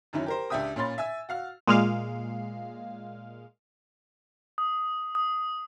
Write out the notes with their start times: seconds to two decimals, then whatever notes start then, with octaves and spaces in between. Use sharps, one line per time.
0.13 F#2 D#3 F#3 C#4 E4
0.26 G4 A#4 C5
0.50 C#2 D4 G4 E5 G5 D#6
0.76 A#2 C#4 B5 C6 A6
0.98 E5 G#5 E6
1.29 F#4 F5 F6
1.68 A#2 G#3 F5
4.58 D#6
5.15 D#6